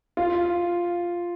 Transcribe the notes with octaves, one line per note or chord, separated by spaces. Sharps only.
F4